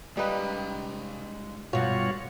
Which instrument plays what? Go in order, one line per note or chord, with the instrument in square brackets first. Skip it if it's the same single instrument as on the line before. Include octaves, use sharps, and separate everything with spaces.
[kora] G3 D#4 B4 [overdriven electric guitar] G#3 F5
[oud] G2 B2 [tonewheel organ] F4 F#4 C#5